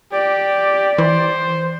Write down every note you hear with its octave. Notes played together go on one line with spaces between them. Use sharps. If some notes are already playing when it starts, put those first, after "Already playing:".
G4 D5
E3 C5